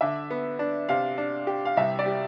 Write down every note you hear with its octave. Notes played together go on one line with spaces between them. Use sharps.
D3 E5
B3
D4
C3 F5
D4
G4
F5
C2 E5
D5
G3